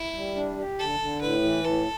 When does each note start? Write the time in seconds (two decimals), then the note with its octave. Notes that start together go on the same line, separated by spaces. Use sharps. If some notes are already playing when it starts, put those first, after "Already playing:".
Already playing: E4
0.15 G3
0.35 D4
0.58 G4
0.79 D3 A4
1.00 D3
1.21 A2 B4
1.44 E3
1.64 A2 A4